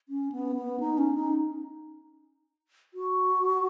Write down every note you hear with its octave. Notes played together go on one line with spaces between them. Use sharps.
C#4
B3
B3
D#4
C#4
D#4
F#4